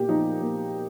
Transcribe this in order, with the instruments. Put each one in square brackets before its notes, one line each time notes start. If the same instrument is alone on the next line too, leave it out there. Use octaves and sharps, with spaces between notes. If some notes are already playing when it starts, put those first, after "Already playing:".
Already playing: [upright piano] A#2 G4
F3 D#4
A#2